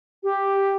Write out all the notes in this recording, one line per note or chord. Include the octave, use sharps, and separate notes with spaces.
G4